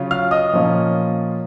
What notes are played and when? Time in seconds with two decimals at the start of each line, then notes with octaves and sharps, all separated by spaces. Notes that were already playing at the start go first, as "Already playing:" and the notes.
Already playing: C#3 F#3 C#4 F4
0.11 F5 F6
0.31 D#5 D#6
0.53 A#2 F3 A#3 C#4 F4